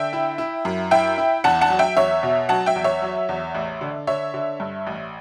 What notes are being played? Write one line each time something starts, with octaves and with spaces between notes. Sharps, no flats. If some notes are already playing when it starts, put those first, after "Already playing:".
Already playing: D3 E5 G5
E4
E4
F#2
E4 E5 G5
E4
E2 F#5 A5
F#5 A5
F#3
E5 G5
E2 C#5 E5
B2
F#3 F#5 A5
E5 G5
E2
C#5 E5
F#3
E2
A1
D3
D3 C#5 E5
D3
G2
A1